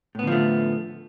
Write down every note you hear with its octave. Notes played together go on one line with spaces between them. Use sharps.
A2 D3 F3 A3 B3